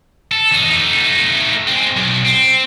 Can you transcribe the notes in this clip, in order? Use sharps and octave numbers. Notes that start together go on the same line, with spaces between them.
A4
E2 D#4
A3 D#4
G#3 C4
B1
C4